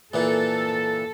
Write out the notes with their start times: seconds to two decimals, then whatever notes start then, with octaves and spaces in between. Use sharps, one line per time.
0.14 A#2 E3 A#3 A4